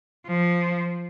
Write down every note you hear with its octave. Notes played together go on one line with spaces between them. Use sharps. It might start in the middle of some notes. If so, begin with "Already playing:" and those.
F3